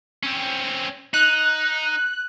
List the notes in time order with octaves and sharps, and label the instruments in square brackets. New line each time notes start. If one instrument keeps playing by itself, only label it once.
[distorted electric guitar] C4 C#4
[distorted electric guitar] D#4 [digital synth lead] F#6